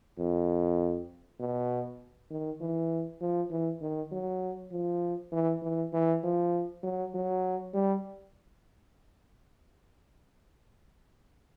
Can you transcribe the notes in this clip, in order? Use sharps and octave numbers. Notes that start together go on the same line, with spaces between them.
F2
B2
D#3
E3
F3
E3
D#3
F#3
F3
E3
E3
E3
F3
F#3
F#3
G3